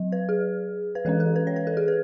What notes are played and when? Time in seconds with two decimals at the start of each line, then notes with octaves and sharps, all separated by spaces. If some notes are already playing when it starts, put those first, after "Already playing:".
Already playing: F#3
0.12 B4
0.29 G#4
0.95 B4
1.05 E3 G#3 C#4 A4
1.20 A4
1.36 B4
1.47 C#5
1.56 B4
1.67 A4
1.77 G#4
1.88 B4